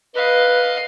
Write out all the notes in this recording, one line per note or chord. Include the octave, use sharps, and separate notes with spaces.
B4 D#5 F5